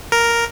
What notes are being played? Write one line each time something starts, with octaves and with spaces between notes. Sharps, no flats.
A#4